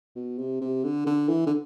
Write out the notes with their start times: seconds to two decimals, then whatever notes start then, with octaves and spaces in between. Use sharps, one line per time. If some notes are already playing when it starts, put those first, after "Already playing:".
0.16 B2
0.38 C3
0.61 C3
0.84 D3
1.07 D3
1.29 E3
1.47 D3